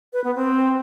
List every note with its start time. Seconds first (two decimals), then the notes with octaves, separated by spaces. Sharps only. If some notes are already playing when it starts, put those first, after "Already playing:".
0.13 B4
0.24 B3
0.35 C4